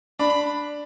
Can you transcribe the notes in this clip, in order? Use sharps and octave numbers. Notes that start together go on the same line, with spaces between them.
D4 B5